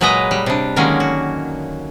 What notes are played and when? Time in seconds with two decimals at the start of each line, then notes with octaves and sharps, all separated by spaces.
0.01 A#2 F#3 G#3 B4 D#5 A#5
0.31 G3
0.46 C3 D4
0.76 D3 D#3 F#3 G#3 A#3 C#4
1.00 F#4